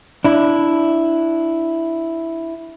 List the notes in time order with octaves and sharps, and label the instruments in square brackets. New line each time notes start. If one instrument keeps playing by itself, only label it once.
[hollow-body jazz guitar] D4 E4